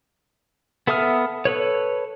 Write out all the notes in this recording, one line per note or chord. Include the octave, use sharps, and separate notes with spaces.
B3 A4 E5 D#6 F6
A4 B4 C#5